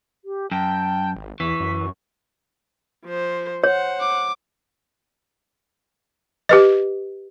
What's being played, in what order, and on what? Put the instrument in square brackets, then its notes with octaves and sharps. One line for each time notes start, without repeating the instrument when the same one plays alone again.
[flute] G4
[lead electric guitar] F#2 [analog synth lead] G5 [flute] A5
[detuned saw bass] G#1
[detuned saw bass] E2 [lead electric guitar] E3 [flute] C#6 [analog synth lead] B6
[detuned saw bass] F#2
[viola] F3 C5
[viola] C5 F#5 [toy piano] C#5
[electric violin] D6
[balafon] G4 B4 D#5